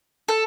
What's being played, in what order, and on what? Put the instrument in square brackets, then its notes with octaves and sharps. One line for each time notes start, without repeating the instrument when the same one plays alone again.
[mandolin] A4